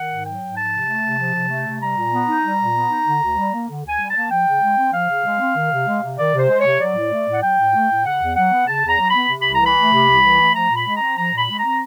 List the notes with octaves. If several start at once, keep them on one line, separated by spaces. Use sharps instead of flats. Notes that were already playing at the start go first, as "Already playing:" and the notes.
Already playing: D#3 F#5
G#2
F#3 G5
G#2
F3 A5
C3
A3
C3
F3
C3
A3
C3
G3 A#5
A#2
B3
D#4
G3
A#2
B3
D#4
D3
D2
G3
A#3
D3
D2 G#5
G3
A5
A#3
F3 G5
C#3
G#3
C4
F3 F5
C#3
G#3
C4
D#3
C3
G#3
C3
D#3 D5
C3 C5
G#3
C3 C#5
F#3 D5
A2
A3
A2
F#5
F#3 G5
A2
A3
A2
C#3 F#5
E2
F#3 F#5
B3
C#3 A5
E2
A#5
F#3
B3 B5
C3
C2 B5
A#5
E3 B5
A3
C3
C2
E3
A3
F3 A#5
A#2
B5
G#3
C4 A#5
F3 A#5
A#2 B5
G#3
A#5
C4